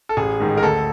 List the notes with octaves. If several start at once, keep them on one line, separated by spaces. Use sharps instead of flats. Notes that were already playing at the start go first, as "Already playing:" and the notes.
A4
A1 G#4
G#2 D#3
A#4
D2 A4